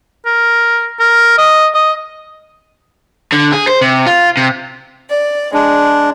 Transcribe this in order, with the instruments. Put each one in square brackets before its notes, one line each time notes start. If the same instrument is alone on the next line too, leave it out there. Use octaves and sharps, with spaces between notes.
[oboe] A#4
A#4
D#5
D#5
[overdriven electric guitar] D3
G#4
C5
C3
F4
C3
[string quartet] D5
[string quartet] G#3 [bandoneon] D4